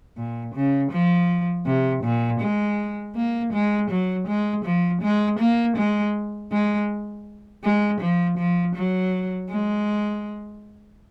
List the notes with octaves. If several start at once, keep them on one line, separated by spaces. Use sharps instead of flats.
A#2
C#3
F3
C3
A#2
G#3
A#3
G#3
F#3
G#3
F3
G#3
A#3
G#3
G#3
G#3
F3
F3
F#3
G#3